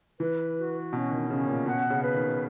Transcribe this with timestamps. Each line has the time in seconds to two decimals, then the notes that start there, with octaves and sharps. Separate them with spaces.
0.20 E3 B4
0.56 F#4
0.93 B2 C#4
1.11 D#3
1.30 C#3 C#4
1.47 A#2
1.66 B2 F#5
1.90 C#3
2.02 B4
2.14 D#3